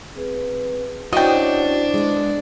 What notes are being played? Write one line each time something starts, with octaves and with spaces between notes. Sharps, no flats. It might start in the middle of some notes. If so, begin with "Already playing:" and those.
C4 G#4 B4
C#4 D4 E4 F#4 C5 D#5 G5 D6
G#3 B3